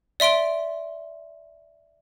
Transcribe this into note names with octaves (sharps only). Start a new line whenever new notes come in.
D5 E5 C6 D7 G7